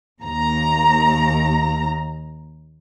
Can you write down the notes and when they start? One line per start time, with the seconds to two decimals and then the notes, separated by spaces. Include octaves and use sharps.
0.20 D#2 A#5